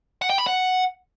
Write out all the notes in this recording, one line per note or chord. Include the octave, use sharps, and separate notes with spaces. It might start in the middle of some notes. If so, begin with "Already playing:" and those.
F#5
G5
B5
F#5